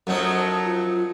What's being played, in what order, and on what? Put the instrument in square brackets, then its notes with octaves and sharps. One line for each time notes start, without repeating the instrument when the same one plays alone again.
[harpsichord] F#2 D#4 [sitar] F3 F#3 A3
[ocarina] F4